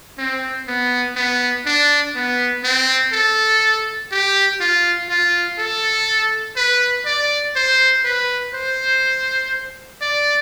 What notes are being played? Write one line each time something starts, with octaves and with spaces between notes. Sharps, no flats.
C4
B3
B3
D4
B3
C4
A4
G4
F4
F4
A4
B4
D5
C5
B4
C5
D5